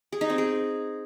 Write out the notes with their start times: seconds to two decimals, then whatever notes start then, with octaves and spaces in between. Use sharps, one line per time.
0.12 G#4
0.21 D#4
0.30 C4
0.38 G#4